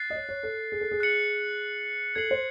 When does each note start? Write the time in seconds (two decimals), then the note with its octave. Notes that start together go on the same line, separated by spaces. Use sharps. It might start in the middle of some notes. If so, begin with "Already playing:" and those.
Already playing: F#6 A6 C7
0.10 D#5
0.15 C#5
0.29 C#5
0.43 A4
0.72 G#4
0.81 A4
0.91 G#4
1.00 F#6 C#7 F#7
2.15 A4 G#6 C7 F#7
2.31 C5